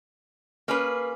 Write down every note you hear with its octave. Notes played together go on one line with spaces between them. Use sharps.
A#3 C#4 G#4 B4